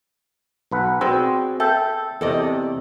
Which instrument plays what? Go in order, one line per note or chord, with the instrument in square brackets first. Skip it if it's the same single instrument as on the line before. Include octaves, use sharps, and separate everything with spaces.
[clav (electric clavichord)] B1 B4 F#5
[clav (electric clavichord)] C4 [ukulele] F#4 G#4 D5
[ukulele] A4 [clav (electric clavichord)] E5 G5
[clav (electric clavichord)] E2 C3 [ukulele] A4 D5 D#5